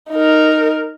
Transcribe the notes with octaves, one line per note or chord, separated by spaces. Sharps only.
D#4 A#4